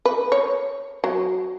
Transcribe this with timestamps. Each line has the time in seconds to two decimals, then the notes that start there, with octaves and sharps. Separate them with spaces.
0.05 B4
0.32 C#5
1.04 F#3